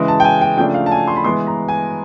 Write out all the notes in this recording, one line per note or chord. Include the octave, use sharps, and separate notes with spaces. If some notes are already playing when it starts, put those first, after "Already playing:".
Already playing: C#3 E3 G#3
A5
G5
G#5
G5
C#3 F3 A3 D4 G5
F5
A5
G#5
C6
B5
E3 G#3 B3 C6
A#5
G#5